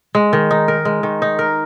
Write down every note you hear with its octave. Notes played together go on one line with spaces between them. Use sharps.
G#3
D#3
D#4
A#4
G#3
D#3
D#4
A#4